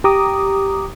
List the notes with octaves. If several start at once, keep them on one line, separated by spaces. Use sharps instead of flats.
G4 A#5 D6 D#6